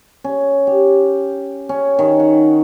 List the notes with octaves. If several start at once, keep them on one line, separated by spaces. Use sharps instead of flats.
C#4
G4
C#4
D#3
F#5